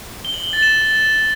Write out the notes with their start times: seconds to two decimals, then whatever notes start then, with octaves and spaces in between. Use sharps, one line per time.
0.25 G7
0.34 F#7
0.44 G7
0.53 A6
0.63 E7